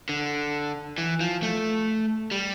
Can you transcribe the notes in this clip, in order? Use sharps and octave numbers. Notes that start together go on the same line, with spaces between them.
D3
E3
F3
A3
G3